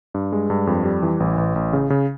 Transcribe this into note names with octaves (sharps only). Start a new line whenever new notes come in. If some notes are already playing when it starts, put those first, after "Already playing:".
G2
G#3
G2
F2
G3
E3
A1
A1
A1
C#3
C#3